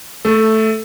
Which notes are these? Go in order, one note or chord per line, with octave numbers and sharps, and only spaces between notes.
A3 A4